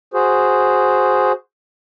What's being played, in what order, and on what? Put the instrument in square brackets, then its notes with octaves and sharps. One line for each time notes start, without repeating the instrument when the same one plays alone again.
[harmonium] F#4 G#4 C5